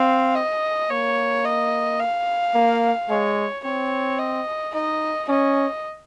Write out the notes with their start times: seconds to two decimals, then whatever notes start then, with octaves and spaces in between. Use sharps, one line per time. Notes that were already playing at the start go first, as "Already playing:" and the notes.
Already playing: C4 F5
0.35 D#5
0.90 A#3 C#5
1.45 D#5
2.00 F5
2.54 A#3
3.09 G#3 C#5
3.64 C4 C#5
4.19 D#5
4.74 D#4 D#5
5.29 C#4 D#5